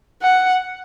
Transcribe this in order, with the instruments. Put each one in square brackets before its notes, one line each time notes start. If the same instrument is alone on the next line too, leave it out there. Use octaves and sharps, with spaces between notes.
[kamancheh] F#5